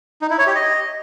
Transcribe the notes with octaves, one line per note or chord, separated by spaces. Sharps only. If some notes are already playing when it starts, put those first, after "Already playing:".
D#4
E4
C#5
G4
D#5